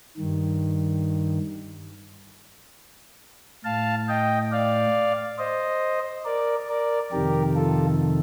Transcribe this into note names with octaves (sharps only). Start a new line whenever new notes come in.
G2 D#3
A2 F5 A5
D#5 G5
D5 F5
C5 D#5
A#4 D5
A#4 D5
F2 C3 D#3 G4 A#4
F4 A4